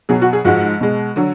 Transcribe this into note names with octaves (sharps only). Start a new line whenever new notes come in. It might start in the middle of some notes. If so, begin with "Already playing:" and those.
B2 F#3 G#4
F#4
G#4
G#2 F3 G#3 F#4
B2 G#3
D3 F#3